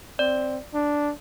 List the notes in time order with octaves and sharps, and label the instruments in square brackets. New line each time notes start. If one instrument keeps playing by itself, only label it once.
[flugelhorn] C4 [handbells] D5
[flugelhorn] D4